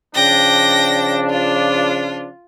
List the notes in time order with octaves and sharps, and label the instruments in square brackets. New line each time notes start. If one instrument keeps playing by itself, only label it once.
[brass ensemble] C#3 F3 D4 [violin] G5 A#6
[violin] F4